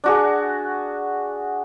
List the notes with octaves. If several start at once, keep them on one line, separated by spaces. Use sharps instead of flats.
D4 F#4 G#4